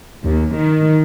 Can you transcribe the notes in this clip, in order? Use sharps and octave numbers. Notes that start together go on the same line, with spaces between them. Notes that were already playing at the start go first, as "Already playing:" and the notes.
D#2
D#3